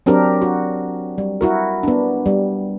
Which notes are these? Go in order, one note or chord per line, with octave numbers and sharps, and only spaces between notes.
F#3 C4 D4 G4 A#4
F#4
G3
E4 F#4 A#4
B3 D4
G3